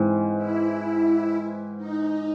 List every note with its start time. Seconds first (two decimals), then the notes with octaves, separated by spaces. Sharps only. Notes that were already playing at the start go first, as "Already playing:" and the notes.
Already playing: G#2 E3 C4
0.37 E4
1.77 D#4